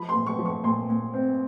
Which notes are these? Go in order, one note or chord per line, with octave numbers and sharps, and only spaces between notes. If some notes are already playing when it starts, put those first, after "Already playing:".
Already playing: F3 B5
C6
A#2
C#6
F3
C#6
A#2 C6
A#2
C4